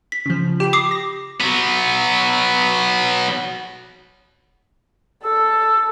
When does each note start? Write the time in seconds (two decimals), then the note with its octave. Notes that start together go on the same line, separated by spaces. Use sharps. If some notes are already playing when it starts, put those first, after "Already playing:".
0.12 B6
0.26 C#3 F3
0.60 G4 G5 B5
0.73 D6 D#6 C7
0.91 A#6
1.40 F#3 B3
5.24 A4 E6